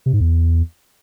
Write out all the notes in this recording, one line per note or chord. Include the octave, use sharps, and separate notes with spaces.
C3
G#2
E2